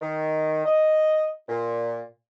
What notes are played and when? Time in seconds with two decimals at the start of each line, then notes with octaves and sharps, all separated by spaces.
0.01 D#3
0.65 D#5
1.49 A#2